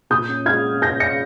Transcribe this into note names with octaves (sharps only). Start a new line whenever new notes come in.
A#2 D#6 G6
C#4
G#3 F6 G#6
C#4
C#4 G6 A#6
C#4 A#6 C#7